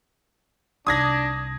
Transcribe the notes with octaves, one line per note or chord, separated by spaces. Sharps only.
C2 C3 D4 D#6 G#6 A#6